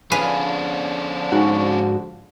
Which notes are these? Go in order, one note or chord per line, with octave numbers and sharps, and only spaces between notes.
D3 F3 C#4 D4 G#4 B4 F5
G#2 F#4